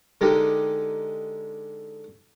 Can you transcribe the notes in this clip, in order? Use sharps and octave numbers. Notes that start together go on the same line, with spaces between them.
D3 G#3 D#4 G4 A#4